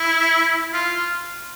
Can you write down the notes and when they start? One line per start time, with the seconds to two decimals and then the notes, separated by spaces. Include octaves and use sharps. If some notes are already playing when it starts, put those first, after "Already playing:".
Already playing: E4
0.73 F4